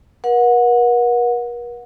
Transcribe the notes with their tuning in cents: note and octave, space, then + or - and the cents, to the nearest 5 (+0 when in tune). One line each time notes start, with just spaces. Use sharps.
A#4 +45 F#5 -25